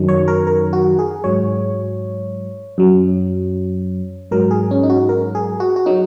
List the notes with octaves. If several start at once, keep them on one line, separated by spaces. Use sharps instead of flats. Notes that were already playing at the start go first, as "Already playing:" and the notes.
Already playing: F#2 D#3 F#3
C#5
A#4
A#4
F#4
G#4
G#2 F#3 C#5
F#2 F#3
G#2 F#3 A#4
G#4
C#4
D#4
F#4
A#4
G#4
F#4
F#4
F#3 D#4